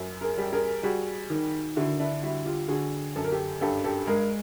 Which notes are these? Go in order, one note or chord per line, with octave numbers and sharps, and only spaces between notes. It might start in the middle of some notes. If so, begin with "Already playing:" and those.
Already playing: F#2
G#4 A#4
G3
G#4 A#4
G3 F#4 G#4
D#3
D3 E4 F#4
D4 E4
G3 E4 F#4
F4 G4
D3 F#4 G#4
F#2 A4
A#4
G4 A4
G2 G4 A4
G4 A4
G#3 G#4 A#4